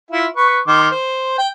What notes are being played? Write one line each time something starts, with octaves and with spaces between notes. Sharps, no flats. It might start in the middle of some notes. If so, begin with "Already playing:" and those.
E4 F4
B4 C#6
D#3 C6 D6
C5
G5